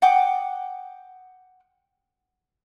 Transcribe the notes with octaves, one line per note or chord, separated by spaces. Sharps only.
F#5 G5 D6 D#6